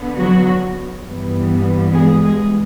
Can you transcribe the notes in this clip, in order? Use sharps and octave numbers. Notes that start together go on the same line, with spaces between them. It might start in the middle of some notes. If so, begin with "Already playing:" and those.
Already playing: D3 B3
F#3 F#4
G2 E3 G3 B3
G#3 G#4
G#3 G#4